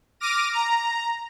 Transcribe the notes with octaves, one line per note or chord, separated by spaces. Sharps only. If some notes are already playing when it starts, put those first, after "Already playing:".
D6 F6 A#6 D#7
A#5